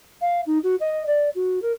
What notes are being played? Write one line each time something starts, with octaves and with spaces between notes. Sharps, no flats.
F5
D#4
F#4
D#5
D5
F#4
A#4